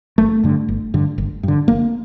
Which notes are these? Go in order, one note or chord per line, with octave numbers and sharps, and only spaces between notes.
G1 A3
G2 D3
G1
G2 D3
G1
G2 D3
G1 A#3